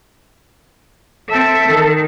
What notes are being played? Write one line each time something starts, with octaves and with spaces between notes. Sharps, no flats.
C4 A4 E5
D#3